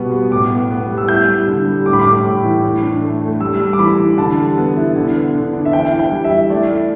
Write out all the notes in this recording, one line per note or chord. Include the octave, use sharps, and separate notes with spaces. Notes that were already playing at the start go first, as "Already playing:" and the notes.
Already playing: B2 G3 B3
B3
A2 D6
B3
B3
G3
E6
E4 G6
G3
D3
G3
A2 D6
B5
A2 D6
A2
E3
A2
D4
A3
A3
G3 E6
G3
D6
E3 B5
E3
D3 A5
G3
B3
E4
D3
B3
D3
D4
E5
E3 G5
E4
G5
G3
E5
E4
A3 D5
E4